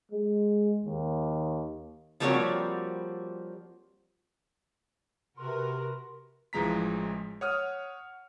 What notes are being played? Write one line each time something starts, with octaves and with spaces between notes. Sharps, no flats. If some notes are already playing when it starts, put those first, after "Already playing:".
G#3
D#2
F3 G3 A#3 C4 F#4 C#5
C3 F#4 A#4 B4 C6
A1 E3 F3 G#3 A#5 B6
C#5 F#5 D#6 F6